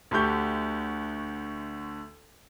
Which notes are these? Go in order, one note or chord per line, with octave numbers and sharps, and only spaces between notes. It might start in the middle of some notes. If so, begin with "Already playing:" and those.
D2 D3 A3 G4 C#6 G6